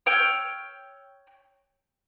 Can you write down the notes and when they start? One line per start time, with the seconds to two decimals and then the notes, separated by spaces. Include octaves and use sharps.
0.06 C#5 G5 E6 F6